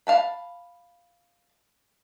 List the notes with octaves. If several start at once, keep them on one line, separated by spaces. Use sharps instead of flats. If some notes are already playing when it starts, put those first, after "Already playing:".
F5 A5 B5